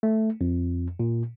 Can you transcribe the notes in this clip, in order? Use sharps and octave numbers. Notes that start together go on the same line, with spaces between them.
A3
F2
A#2